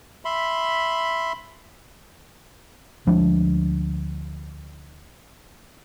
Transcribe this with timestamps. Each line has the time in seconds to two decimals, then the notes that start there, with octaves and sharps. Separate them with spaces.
0.25 E5 B5 C6
3.07 D2 F3 G#3 D4